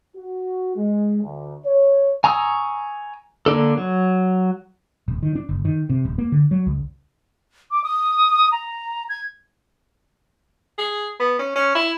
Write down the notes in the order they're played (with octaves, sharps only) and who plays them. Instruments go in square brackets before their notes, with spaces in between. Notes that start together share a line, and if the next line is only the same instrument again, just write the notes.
[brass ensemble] F#4
G#3
D2
C#5
[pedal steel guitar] G#5 A#5 C#6 D#6 E6
D3 A#3 D4 A4
F#3
[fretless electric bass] D#1
D#3
D4
F#1
D#3
C3
D#1
A#3
D3
F#3
C#2
[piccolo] D6
D#6
A#5
G#6
[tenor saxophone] G#4
B3
C#4
C#4
E4